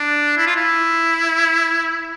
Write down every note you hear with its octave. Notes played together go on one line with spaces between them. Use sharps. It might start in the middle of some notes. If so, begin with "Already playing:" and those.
Already playing: D4
E4
F4
E4